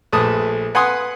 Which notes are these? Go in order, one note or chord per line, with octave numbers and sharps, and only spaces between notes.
A#1 A3 B4 A5 D#6
B4 F#5 G#5 C6 D#6